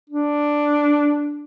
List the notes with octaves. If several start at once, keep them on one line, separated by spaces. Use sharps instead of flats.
D4